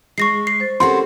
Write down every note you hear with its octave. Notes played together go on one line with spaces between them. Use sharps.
G#3 C#6 A#6 C7
C7
C5 A6
C4 C#4 F#4 G4 A4 A#4 C6